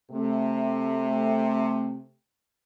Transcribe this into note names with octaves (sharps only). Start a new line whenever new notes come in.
C3 A3